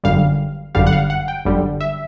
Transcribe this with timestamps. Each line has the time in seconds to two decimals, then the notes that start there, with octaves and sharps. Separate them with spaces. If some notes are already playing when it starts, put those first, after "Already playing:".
0.04 G1 F#2 D3 G3 F5
0.75 G1 F#2 D3 G3 F5
0.87 F#5
0.93 F5
1.10 F#5
1.28 G5
1.45 G1 F#2 D3 G3
1.81 E5